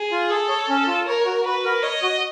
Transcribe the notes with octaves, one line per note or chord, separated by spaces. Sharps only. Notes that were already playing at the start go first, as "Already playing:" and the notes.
Already playing: G#4
F4
G#4 A4
C#5
C#4
F4
A#4 C#5
F#4
F#4 B4
A#4
C#5 D#5
F#4